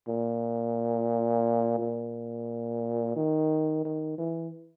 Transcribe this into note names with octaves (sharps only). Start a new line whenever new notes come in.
A#2
A#2
D#3
D#3
E3